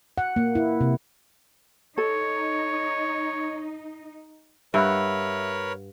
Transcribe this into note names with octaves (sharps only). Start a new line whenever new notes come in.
F#5
A#3
E4
C3
D#4 A4 C#5
G2 A#4 B4 C#5 E5 F#5 B5 E6